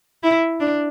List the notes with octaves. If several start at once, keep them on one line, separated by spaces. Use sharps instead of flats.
E4
D4